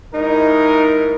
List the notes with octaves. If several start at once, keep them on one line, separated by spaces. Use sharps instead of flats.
G#2 D#4 E4 A#4